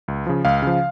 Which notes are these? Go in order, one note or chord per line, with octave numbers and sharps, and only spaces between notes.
C#2
C#3 F3
C#2 F5
C#3 F3